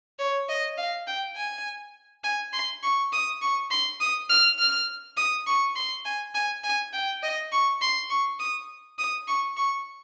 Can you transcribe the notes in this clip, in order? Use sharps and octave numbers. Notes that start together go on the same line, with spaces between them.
C#5
D#5
F5
G5
G#5
G#5
C6
C#6
D#6
C#6
C6
D#6
F6
F6
D#6
C#6
C6
G#5
G#5
G#5
G5
D#5
C#6
C6
C#6
D#6
D#6
C#6
C#6